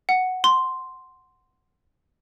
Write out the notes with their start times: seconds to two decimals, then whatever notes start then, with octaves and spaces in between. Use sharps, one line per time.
0.09 F#5
0.44 C6